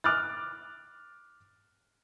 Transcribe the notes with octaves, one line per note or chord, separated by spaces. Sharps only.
D6 F6 F#6 A6